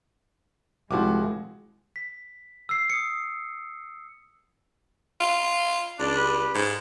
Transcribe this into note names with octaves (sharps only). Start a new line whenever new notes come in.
C2 F3 G#3 E4 F#4 D6
B6
E6 C7
D#6 C#7
F4
C#2 D4
G3 D4 B4
G#2